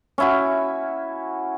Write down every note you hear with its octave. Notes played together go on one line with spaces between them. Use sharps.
C#4 E4 F#4